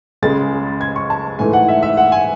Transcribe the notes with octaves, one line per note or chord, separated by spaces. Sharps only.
C#2 C#3 G#3 A6
G#6
C#6
A5
G#2 E3 A3 G#5
F#5
E5
E5
F#5
G#5